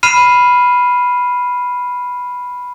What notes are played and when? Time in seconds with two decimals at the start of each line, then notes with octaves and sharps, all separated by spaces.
0.03 B5 F6 C7 D#7 E7